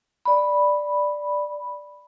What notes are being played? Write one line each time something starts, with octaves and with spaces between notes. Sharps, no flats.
D5 B5